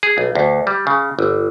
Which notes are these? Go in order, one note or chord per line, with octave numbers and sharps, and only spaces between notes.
G#4
B1
D2
G3
C#3
G1